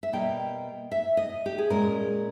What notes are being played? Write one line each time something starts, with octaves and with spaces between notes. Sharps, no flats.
E5
B2 G3 A#3 G5
E5
D#5
G4
G#4
A#2 G#3 C#4 A#4